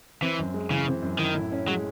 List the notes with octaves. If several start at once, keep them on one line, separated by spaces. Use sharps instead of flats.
E3 C4
F#2
G#3
C#3 E3
C4
F#2
D#3 E4
A2
C#4
F#3 G#3